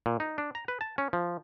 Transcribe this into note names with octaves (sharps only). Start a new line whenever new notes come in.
A#2
D#4
D4
A#5
B4
A5
C#4
F3